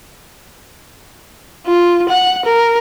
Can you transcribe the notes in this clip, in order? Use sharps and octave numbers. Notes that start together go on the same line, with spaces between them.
F4
F#5
A#4